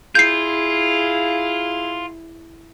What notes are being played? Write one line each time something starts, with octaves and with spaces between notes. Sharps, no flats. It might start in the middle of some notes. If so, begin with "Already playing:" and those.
E4 F4 G#4 G6 C7